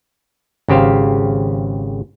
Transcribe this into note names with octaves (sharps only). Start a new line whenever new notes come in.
G#1 C#3 G4 C5 F5